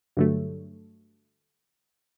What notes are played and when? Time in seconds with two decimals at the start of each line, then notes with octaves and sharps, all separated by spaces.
0.17 G2 D3 F#3 A3